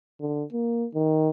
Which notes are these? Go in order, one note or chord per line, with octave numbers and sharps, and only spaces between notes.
D3
A#3
D#3